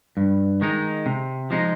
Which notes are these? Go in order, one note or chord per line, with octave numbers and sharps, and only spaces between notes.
G2
D#3 G#3 D#4
C3
F3 G#3 D#4